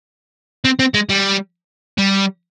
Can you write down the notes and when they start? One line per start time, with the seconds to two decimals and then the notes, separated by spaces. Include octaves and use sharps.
0.65 C4
0.79 C4
0.94 G#3
1.09 G3
1.98 G3